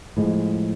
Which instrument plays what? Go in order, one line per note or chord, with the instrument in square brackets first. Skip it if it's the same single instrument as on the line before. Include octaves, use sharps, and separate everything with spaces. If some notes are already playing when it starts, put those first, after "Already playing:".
[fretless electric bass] A2 F3 G#3